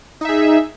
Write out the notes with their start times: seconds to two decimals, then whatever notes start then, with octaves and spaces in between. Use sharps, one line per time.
0.21 D#4
0.25 E5
0.29 G#4